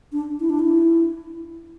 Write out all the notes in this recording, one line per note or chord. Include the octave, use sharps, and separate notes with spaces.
D4
E4
D4
E4